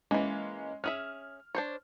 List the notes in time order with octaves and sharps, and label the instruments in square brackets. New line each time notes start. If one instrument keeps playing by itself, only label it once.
[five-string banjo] E3 A#3 [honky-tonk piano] G#3 C#4
[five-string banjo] C#4 G#4 E5 [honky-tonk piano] F6
[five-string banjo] D4 C5 C#5